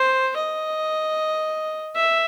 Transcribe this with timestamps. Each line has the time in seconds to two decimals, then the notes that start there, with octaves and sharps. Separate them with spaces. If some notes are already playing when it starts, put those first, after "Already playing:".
Already playing: C5
0.37 D#5
1.96 E5